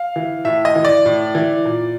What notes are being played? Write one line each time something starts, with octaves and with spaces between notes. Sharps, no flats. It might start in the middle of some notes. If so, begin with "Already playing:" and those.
Already playing: F5
E3
A2 E5
D#5
E3
D5
A2
E3
A#2